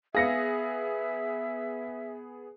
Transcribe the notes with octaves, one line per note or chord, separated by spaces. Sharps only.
B3 G#4 E5 F5 A#6 C#7